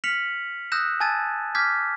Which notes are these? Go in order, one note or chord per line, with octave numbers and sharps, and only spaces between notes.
F6 B6 C#7 F7 F#7
D#6 E6 F#6 G6 A#6 E7
G#5 A5 E6 G#6 A6 D#7
D6 F6 G6 G#6 B6